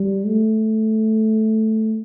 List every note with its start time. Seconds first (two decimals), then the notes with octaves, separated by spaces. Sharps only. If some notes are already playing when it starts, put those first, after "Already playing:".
Already playing: G3
0.27 A3